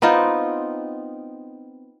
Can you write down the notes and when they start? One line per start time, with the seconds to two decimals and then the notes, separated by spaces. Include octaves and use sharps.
0.02 B3 C4 D#4 F4